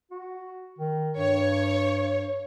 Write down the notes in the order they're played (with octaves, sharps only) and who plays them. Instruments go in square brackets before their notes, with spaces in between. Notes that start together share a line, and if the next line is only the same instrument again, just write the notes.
[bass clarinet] F#4
D#3
[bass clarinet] G2 [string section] C#5